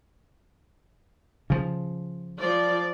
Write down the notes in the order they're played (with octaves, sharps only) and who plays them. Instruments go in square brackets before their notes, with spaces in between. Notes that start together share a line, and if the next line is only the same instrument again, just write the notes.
[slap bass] C#3 F3
[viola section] F3 D5